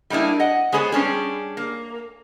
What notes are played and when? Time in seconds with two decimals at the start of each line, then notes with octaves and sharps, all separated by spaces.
0.10 G3 G#3 A#3 D4 E4
0.40 D#5 F#5
0.72 G#3 B3 G#4 C5 C#5
0.92 G3 C#4 D4 G#4
1.57 A#3